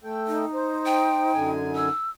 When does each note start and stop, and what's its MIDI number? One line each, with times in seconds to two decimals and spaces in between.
0.04 0.45 57
0.04 0.45 69
0.04 0.45 79
0.27 1.88 63
0.53 1.32 72
0.86 1.50 79
1.33 1.89 42
1.33 1.89 50
1.33 1.89 80
1.76 2.10 88